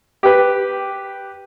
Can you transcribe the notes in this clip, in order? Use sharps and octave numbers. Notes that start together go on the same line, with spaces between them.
G4 B4